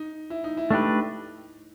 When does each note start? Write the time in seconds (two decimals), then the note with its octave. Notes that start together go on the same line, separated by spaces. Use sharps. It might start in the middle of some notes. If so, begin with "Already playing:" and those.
Already playing: D#4
0.30 E4
0.44 D#4
0.57 E4
0.70 A3 D4 D#4 G4 B4